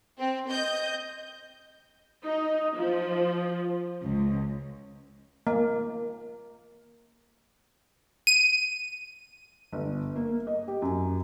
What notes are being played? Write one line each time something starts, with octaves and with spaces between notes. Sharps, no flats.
C4
D#5 G6
D#4
F3
C#2
A#3
D#7
G1
A#3
D#5
G4
F#2